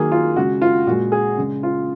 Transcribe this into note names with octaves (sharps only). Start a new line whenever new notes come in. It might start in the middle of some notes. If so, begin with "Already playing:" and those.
Already playing: D#3 F#3 A#3 G#4
F4
C#3 G#3 F#4
F4
A#2 G#3 F#4
G#4
C#3 G#3
F4